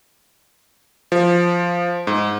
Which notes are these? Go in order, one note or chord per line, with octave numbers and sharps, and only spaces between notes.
F3
G#2